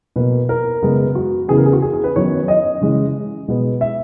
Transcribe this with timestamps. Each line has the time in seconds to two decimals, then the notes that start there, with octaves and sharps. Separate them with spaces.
0.16 B2 A#3 B4
0.49 A#4
0.83 F#2 C#3 G#3 B3
1.15 F#4
1.48 C#3 E3 B3 G#4
1.58 A#4
1.66 G#4
1.73 F#4
1.82 G#4
1.93 G#4
2.04 B4
2.16 F#2 D#3 F#3 B3 C#5
2.48 D#5
2.81 C#3 E3 G#3
3.48 B2 G#3 B3
3.81 E5